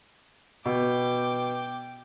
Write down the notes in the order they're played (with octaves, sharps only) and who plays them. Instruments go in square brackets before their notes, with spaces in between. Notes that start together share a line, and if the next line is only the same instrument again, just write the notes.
[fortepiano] B2 [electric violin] G5 D6